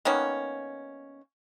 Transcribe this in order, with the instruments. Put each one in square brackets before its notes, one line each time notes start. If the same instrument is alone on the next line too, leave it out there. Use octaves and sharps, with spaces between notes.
[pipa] D#3 A#3 B3 C#4